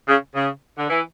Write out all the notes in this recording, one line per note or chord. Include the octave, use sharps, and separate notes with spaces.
C#3
C#3
D3
E3